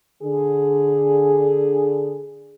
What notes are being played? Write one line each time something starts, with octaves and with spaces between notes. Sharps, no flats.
D3 G#4